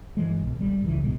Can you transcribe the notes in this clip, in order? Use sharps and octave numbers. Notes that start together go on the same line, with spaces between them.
G2 E3 G#3
B1
G#1 G3
G#1 C#2 E3
E1 A#1 B2 G#3